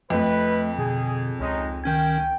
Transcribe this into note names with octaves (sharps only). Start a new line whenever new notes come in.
F2 A3 B4 D#5
B2 D3 G#4
C#2 G#3 C#4 D#4
D#3 C#4 G5 G#6